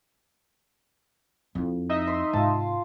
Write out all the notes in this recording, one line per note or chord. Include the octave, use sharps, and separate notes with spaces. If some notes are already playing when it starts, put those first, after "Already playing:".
F2 E4
D#4 D#5 E5
C6
G#2 C3 F4 A5